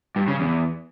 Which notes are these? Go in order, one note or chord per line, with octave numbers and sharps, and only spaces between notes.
G2
C#3
E2